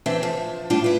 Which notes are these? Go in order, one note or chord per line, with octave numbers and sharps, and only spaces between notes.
E3 C4 D4 C5 E5
F3
A2 G3 D4 F4
E4 B4